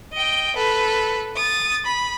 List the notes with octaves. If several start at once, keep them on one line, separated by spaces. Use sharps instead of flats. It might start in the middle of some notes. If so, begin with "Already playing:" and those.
D#5 G5
A4 B4
D#6 A6
B5